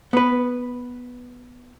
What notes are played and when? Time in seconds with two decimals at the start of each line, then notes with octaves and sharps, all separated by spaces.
0.13 B3 B4